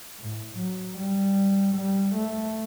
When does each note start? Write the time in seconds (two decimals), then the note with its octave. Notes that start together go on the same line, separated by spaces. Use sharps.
0.19 A2
0.58 F#3
0.98 G3
1.76 G3
2.16 A3